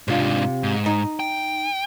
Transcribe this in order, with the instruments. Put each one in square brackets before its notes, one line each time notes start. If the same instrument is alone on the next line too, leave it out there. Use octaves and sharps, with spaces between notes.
[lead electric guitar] G#2 D4 [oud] C3 F4
[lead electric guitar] G#2
[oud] D#4
[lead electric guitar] G5